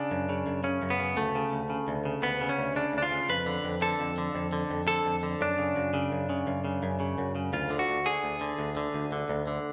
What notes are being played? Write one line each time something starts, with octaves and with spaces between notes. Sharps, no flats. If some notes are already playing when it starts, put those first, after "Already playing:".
Already playing: C#3 D4
F#2
C#3
F#2
C#3 C#4
F#2
B3
C#3
D2 A3
C#3
D2
C#3
D2
C#3
D2 B3
C#3
C#4
D2
C#3 D4
D2 D4
F4
C#3
F2 B4
D3
F2
D3 A4
F2
D3
F2
D3
F2
D3 A4
F2
D3
F#2 D4
C#3
F#2
C#3
F#2
C#3
F#2
C#3
F#2
C#3
F#2
C#3
D2 F4
D3
F#4
D2
D3 G#4
D2
D3
D2
D3
D2
D3
D2
D3